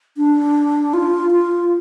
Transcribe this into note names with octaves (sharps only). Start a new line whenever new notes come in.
D4
F4
F4